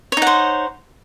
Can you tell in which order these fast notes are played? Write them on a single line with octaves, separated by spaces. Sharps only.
C#5 D#4 F#5 C5